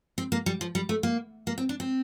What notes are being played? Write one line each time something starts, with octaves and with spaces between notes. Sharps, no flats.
C4
A#3
G3
F3
G3
A3
A#3
A#3
C4
D4
C4